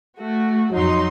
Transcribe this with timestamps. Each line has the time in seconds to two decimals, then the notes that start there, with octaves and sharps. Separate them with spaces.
0.19 A3 F#4
0.73 F2 F#3 D#4 C6